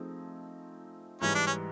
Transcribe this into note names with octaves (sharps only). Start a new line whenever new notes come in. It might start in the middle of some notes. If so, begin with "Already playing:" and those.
Already playing: F3 A3 C4 D#4 G#4
G#2 E3 G3 C#4
D4
C#4